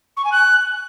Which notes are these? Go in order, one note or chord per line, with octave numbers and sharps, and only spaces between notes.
C#6
G#5
F#6